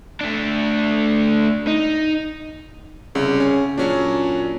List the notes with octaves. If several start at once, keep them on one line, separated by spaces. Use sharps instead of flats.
A3 D4
D#4
C2 C#3
C#4
A#2 F#3 C#4 D4